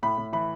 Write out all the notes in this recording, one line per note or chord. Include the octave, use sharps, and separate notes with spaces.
A2 B5
A2
E3 B5